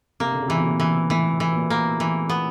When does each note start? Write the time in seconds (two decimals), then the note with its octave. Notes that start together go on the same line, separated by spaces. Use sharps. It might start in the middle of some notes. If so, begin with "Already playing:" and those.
0.20 C3 A#3
0.32 D3
0.40 C#3
0.48 C3 E3
0.57 B2
0.65 A#2
0.80 E3
1.10 A2 E3
1.40 E3
1.54 A#2
1.70 A#3
2.00 E3
2.29 B3